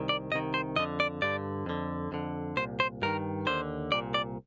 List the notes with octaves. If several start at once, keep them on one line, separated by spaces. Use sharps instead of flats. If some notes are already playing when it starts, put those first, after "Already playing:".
Already playing: C2 C3 D#3
D5
C2 C3 D#3 D#5
C5
F2 D3 D#5
D5
G2 D3 D5
F2 D3
F2 D3
C2 A#2 C5
C5
G2 D#3 A#4
D#2 D3 C5
C2 A#2 D5
D5